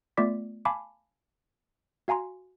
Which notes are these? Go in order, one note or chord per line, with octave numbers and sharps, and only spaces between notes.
A3 B3 F4 D5 D6 B6
F5 G#5 A5 B5 D6
F#4 F5 G#5 A#5 C6